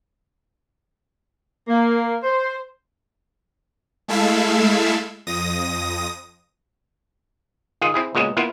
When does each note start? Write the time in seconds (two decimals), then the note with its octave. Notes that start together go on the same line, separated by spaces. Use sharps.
1.67 A#3
2.22 C5
4.08 G#3 A3 E4 A4 E5 F5
5.27 F2 D#6 A#6
7.81 D#3 F4 G#4
7.94 C4 E4 G#4
8.15 A#2 C#3 G#3 B3 C#4 F#4
8.37 A#3 B3 E4 F4